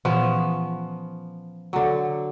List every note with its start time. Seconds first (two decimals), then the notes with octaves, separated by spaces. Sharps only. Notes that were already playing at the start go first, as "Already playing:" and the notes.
0.05 A#2 E3 F3 B3 C#4
1.73 D3 F#3